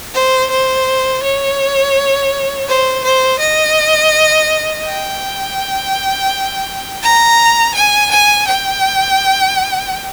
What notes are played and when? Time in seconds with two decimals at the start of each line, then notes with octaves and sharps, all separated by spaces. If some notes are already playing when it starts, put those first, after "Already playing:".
0.14 C5
0.51 C5
1.23 C#5
2.68 C5
3.04 C5
3.40 D#5
4.85 G5
7.03 A#5
7.75 G#5
8.11 G#5
8.48 G5